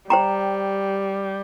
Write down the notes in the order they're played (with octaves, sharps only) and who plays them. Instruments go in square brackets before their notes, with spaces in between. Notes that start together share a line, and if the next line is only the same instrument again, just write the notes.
[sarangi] G3 [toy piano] C5 G5 A#5